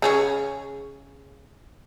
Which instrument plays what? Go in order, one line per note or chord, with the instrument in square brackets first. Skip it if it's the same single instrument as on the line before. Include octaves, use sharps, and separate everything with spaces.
[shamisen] C#3 C#4 G#4